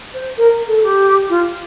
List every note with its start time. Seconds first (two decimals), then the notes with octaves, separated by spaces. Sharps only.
0.14 C5
0.37 A#4
0.67 A4
0.83 G4
1.29 F4